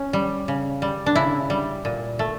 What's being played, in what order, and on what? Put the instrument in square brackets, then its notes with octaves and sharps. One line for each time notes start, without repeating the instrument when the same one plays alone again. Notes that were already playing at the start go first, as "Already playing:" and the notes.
Already playing: [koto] C#4
G3
C#3
G3
D4
C#3 E4
G3
A#2
A3